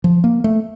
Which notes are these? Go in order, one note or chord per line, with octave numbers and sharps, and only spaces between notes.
F3
A#3
A3